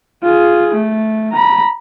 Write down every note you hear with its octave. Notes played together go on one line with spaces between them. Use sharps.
F4 G#4
A3
A#5 B5